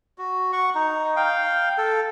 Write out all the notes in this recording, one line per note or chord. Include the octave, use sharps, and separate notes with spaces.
F#4
F#5 C#6
D#4
F5 G5
A4